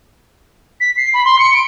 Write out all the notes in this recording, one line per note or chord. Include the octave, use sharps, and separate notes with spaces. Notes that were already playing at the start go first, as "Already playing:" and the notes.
B6
C7
B5
C6
C#7
D7